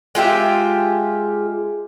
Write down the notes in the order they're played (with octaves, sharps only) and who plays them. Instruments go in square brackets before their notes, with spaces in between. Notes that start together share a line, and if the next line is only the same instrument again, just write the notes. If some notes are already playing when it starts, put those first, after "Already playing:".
[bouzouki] G#3 F4 G4 E5